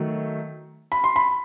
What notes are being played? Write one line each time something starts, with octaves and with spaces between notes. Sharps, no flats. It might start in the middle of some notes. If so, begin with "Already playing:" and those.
Already playing: D#3 F#3 A3
B5
C6
B5